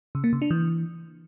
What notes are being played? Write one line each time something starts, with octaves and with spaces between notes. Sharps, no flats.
C#3
A#3
C#3
D4
E3